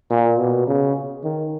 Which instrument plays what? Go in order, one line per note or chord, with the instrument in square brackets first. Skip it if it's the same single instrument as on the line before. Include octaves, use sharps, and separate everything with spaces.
[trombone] A#2
B2
C#3
D#3